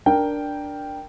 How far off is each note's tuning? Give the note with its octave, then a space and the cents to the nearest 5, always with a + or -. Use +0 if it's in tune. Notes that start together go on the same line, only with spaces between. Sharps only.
D4 +0 A#4 +0 G5 +0